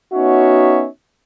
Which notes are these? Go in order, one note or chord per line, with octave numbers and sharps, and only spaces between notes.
B3 C#4 D#4 F#4 C#5 E5